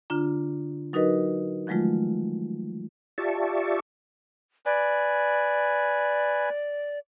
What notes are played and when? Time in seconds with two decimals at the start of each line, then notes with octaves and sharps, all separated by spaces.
0.10 D3 D4 F4 A#5
0.93 F#3 D#4 F#4 A#4 B4 D#5
1.67 D#3 F3 F#3 G#3 A3 F4
3.18 F4 G4 D5 E5 A5 C#6
4.66 B4 D5 G#5